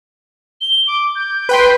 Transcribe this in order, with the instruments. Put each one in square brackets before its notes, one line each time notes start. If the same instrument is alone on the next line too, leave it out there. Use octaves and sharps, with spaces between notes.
[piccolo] G7
D6
G6
[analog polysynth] B4 G5 C6